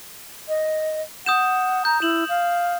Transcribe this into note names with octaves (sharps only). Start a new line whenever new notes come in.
D#5
F#5 D#6 G6 E7
A#5 G6
E4 E7 F#7
F5